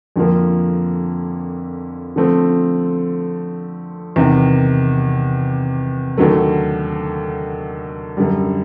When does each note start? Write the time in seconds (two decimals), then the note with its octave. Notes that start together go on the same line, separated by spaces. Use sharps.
0.16 F2 D3 F3 A#3
2.16 D3 F3 A3 C4
4.16 E2 C3 D#3
6.17 D#2 D3 F#3 A3
8.17 F#2 D3 G3